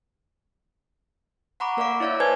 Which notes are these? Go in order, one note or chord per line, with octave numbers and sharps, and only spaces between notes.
F#5 A#5 B5 C#6 D6
A#3 A#4 D5 F5 D6
E4 C#5 D5 E5 F5
B4 C5 D5 G#5 A5 G#6